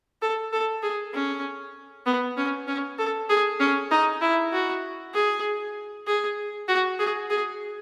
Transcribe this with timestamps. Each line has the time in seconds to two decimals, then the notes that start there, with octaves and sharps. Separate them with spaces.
0.22 A4
0.53 A4
0.83 G#4
1.14 C#4
2.06 B3
2.37 C#4
2.67 C#4
2.99 A4
3.29 G#4
3.60 C#4
3.91 D#4
4.22 E4
4.52 F#4
5.14 G#4
6.07 G#4
6.68 F#4
6.99 G#4
7.30 G#4